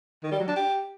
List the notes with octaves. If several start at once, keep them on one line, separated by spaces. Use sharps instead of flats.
D#3
G3
F#3
D4
G4